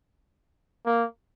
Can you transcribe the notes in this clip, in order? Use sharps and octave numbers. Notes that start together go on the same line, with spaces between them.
A#3